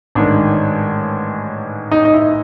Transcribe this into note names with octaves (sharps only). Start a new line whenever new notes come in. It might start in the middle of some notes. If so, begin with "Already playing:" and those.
A1 G#2 D#3 D4
D#4
D#4
E4